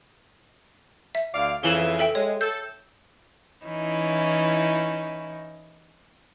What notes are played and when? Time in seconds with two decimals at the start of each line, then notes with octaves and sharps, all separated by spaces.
1.15 E5
1.35 D2 D5 F5
1.64 F2 C#3 E3 E7 F#7 G7
1.99 A4 E5 G5
2.15 G#3 C#5
2.41 A4 G6
3.65 E3 C#4 D#4 E4